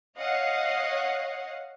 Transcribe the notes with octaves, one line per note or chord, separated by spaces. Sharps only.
C#5 D#5 F5 F#5